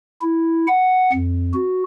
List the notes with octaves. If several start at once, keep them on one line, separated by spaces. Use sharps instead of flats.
E4
F#5
F2
F#4